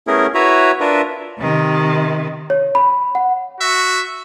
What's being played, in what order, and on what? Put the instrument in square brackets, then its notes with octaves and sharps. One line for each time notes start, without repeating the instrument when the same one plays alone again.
[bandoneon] A3 B3 C#4 E4 G#4 A#4
E4 F#4 B4 C#5 E5 A#5
D4 F4 A#4 B4 E5
[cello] C3 D#3
[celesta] C#5
B5
F#5
[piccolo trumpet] F#4 [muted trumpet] E5